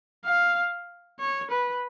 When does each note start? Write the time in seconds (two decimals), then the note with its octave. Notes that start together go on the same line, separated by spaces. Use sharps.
0.25 F5
1.20 C#5
1.51 B4